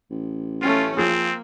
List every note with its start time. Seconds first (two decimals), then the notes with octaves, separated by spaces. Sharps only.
0.10 A1
0.62 A3 C#4 F4
0.97 F3 A#3 C4 G#4